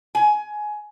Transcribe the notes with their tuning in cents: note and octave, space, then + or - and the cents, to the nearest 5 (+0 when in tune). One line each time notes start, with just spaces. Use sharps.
G#5 +20